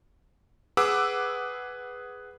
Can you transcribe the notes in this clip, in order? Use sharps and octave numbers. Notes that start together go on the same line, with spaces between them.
G#4 B4 F#5 D6 E6